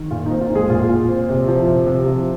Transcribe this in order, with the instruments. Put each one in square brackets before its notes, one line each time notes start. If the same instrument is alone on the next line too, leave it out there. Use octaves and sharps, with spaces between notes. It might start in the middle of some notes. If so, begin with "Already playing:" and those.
Already playing: [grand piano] D#3
A#2 F4
D#4
C4
F4
A#2
G#3 G#4
A#2 F4
A#2
C4
C3
F3
C3
C3
F3